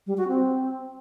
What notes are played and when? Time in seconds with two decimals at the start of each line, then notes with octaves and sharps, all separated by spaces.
0.07 G3
0.17 F#4
0.28 C4